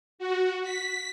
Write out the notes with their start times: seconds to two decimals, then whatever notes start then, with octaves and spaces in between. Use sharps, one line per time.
0.19 F#4
0.63 B6